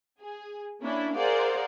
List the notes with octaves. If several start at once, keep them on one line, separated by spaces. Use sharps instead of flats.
G#4
A#3 C#4 D4 E4
G#4 A#4 C5 D5 F5 F#5